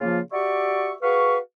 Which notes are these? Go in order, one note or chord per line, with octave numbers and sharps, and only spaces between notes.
C#3 F3 A#3 F4
F#4 G4 D5 E5 C#6
F#4 G#4 B4 F5 C#6